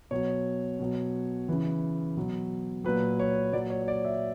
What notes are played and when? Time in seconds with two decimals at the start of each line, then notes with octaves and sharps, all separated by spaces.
0.11 B2 F#3 C#5
0.80 B2 F#3
1.48 C#3 E3
2.17 B2 F#3
2.84 A#2 F#3 B4
3.20 C#5
3.53 A#2 F#3 D5
3.70 C#5
3.82 C#5
3.88 D5
4.05 E5